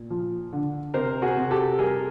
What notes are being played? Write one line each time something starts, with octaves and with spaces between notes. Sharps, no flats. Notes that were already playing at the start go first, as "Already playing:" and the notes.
Already playing: A#2
F3
D3
C3 A#4 C5
F#4 G#4
C3
G4 A4
G3 G#4 A#4